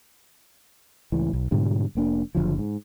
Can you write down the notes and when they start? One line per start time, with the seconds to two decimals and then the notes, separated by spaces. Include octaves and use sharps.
1.12 C#2 A2 E3
1.33 B1
1.51 G#2 B2 D3 G3
1.95 F1 A#3 D4
2.35 F#1 D2 D3 F3
2.58 G#2